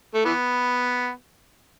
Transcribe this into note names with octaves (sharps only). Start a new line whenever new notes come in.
A3
E3 B3